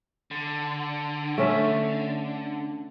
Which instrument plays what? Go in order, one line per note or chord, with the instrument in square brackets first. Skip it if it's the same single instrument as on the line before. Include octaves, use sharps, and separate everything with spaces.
[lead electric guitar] D3
[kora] A3 C#4 E5